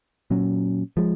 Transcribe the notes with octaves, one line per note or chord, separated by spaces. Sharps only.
A#2 F#3 C#4
F3 G#3